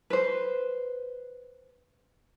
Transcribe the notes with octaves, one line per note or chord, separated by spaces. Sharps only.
B4 C5